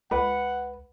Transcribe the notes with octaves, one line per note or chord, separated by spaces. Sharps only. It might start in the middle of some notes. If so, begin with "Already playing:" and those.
C#2 B4 F#5